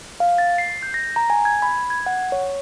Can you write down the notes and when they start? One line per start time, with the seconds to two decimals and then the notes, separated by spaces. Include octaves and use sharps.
0.20 F5
0.38 A6
0.58 C7
0.83 G6
0.94 A#6
1.16 A#5
1.30 G#5
1.45 G#6
1.62 B5
1.90 G#6
2.06 F#5
2.32 C#5